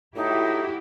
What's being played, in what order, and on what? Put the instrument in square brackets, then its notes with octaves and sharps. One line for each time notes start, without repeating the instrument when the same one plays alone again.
[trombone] A2 [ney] D#4 [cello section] E4 F#4 G4